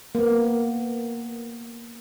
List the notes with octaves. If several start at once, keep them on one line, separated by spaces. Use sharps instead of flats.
A#3 B3